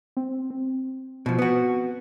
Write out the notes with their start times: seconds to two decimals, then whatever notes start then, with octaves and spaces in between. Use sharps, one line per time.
0.17 C4
0.50 C4
1.26 B2 F3
1.39 B3 F#4